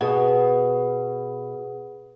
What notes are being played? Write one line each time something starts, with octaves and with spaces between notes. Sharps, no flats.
B2 G#4 F#5